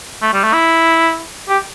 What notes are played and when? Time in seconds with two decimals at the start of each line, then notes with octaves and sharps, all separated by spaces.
0.22 A3
0.33 G3
0.44 A3
0.53 E4
1.48 G4